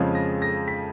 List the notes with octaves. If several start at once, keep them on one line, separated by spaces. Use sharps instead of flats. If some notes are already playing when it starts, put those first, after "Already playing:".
Already playing: F2 C#3 F3 G#3
A#6
A#6
B6